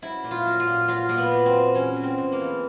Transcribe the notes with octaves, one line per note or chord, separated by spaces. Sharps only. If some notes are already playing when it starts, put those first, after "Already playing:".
F#3 E4
A#2
F4
F#3
F4
A#2
F#3 F4
A#2 A#3
B3
F#3
C4
A#2
E2 C#4
F#3
C4
B2
A#3
E2